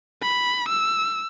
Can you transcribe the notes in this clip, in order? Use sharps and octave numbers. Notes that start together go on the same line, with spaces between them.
B5
E6